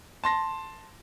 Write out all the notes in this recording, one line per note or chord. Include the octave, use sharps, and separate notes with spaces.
A5 C6 A#6